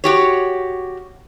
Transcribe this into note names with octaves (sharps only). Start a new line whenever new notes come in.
F#4 G4 C#5